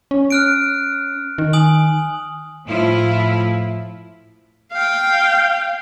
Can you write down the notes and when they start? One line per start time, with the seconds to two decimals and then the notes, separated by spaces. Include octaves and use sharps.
0.11 C#4
0.30 F6 F#6 D7
1.38 D#3
1.53 G#5 D#6 F#7
2.67 A2 F3 E4 F4
4.73 F5 G5